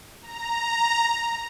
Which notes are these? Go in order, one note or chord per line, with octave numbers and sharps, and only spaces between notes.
A#5